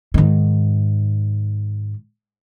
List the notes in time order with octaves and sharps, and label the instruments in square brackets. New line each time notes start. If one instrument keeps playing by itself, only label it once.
[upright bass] G#2 D#3